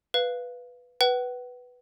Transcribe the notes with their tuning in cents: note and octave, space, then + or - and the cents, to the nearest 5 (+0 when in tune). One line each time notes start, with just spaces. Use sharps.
B4 +0 F5 +0
B4 +0 F#5 +40